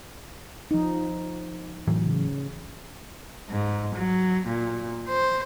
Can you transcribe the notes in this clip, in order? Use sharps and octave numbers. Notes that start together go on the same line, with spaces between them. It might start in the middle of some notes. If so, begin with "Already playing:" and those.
F3 D#4
A2 E3 F#3
C#3
G#2
F#3
A#2
C5